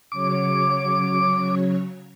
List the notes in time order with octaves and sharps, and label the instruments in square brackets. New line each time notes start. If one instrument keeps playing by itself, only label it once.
[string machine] C#3 F#3 C#5 [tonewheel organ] D6